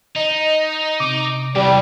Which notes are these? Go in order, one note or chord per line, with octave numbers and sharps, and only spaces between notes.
D#4 D#5
C3 D6
E2 C3 E3 G3 G4